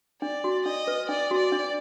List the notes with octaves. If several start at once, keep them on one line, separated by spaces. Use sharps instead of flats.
D4 D5
F#4
D4 D#5
B4
D4 D5
F#4
D5
D4